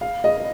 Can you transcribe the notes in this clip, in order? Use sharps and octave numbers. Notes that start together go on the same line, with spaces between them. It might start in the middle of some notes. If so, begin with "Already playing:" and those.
F5
D#5